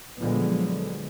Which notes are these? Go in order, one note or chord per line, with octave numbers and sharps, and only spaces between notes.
A#2 D3 F3 F#3 G#3 B3